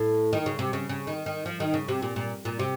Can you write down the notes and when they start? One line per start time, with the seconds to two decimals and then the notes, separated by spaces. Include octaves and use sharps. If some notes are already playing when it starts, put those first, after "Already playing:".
Already playing: A2
0.33 D#3
0.46 C#3
0.59 C3
0.73 C#3
0.89 C#3
1.07 D#3
1.26 D#3
1.46 F3
1.60 D#3
1.74 C#3
1.88 C3
2.02 A#2
2.16 A#2
2.45 A#2
2.59 C3